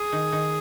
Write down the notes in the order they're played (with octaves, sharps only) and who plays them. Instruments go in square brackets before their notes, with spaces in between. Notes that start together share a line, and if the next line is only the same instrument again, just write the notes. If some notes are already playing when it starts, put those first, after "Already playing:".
Already playing: [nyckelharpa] G#4
[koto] D#3
D#3